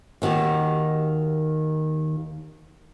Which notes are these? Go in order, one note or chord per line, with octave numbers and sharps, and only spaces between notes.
D#2 D#3 F#4 G4